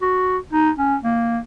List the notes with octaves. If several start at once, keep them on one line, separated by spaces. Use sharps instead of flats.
F#4
D#4
C#4
A#3